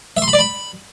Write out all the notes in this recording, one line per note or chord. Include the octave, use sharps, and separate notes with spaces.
E5
C6
B5
D5
B5